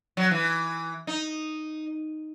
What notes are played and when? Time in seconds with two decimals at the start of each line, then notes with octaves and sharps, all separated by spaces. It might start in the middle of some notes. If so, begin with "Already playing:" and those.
0.17 F#3
0.31 E3
1.07 D#4